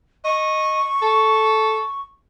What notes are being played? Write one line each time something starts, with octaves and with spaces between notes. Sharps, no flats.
D#5 C#6
A4